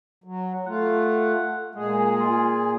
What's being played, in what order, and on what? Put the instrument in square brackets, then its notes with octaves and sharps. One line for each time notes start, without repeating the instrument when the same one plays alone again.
[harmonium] F#3
[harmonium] A3 F4 [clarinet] F#5
[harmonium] A#2 G#4 [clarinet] G#3
[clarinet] F4